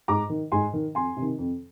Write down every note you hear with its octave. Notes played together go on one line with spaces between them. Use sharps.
G#2 A#5 D6
D#3
G#2 G#5 C6
D#3
F2 G#5 C6
C3
D#3
F2